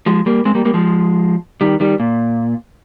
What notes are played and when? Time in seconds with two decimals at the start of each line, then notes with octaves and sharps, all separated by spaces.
0.06 F3 G#3
0.26 G3 A#3
0.45 G#3 C4
0.55 G3 A#3
0.65 G3 A#3
0.74 F3 G#3
1.61 D#3 G3
1.80 D#3 G3
2.00 A#2